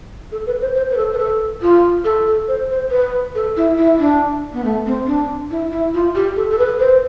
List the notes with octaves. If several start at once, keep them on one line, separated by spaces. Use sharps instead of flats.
A4
B4
C5
C5
B4
A4
B4
A4
F4
A4
A4
C5
C5
B4
A4
E4
E4
D4
B3
A3
C4
D4
E4
E4
F4
G4
A4
A4
B4
C5